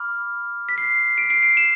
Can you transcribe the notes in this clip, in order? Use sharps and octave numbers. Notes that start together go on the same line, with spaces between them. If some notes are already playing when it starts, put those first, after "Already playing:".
Already playing: B5 D6 F6
B6
C7
D7
C7
D7
E7